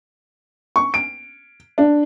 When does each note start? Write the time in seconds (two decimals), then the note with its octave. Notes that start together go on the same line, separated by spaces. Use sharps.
0.76 C#6
0.94 D7
1.78 D4